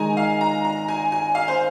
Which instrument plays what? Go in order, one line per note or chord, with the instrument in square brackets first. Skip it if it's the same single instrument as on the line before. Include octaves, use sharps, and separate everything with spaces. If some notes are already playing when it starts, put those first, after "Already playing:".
Already playing: [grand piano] D#3 G#3 D#4 [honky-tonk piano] G#5 A#5
[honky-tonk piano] F5
A#5
A#5
G#5
G#5
F5
C5